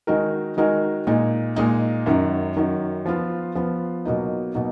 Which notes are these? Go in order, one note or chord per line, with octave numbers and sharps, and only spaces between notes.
D#3 G#3 D#4 F#4 A#4
D#3 G#3 D#4 F#4 A#4
A#2 G#3 D#4
A#2 G#3 D#4
F#2 D#3 F#3
F#2 D#3 F#3
F3 B3 F4
F3 B3 F4
B2 F#3 A#3 D#4
B2 F#3 A#3 D#4